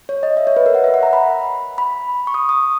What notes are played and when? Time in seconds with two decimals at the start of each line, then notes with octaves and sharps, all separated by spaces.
0.09 C#5
0.23 D#5
0.37 E5
0.47 C#5
0.57 B4
0.66 A#4
0.75 F#5
0.84 E5
0.94 F#5
1.03 A#5
1.13 B5
1.78 B5
2.27 C#6
2.34 D#6
2.49 D#6